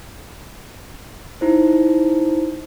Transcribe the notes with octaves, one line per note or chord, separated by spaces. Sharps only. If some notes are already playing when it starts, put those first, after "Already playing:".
D#4 E4 C5